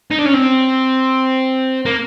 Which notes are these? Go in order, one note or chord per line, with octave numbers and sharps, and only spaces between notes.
D#4
D4
C#4
C4
A#3